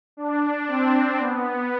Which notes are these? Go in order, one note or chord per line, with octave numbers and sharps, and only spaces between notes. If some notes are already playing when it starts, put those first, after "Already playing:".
D4
C4
B3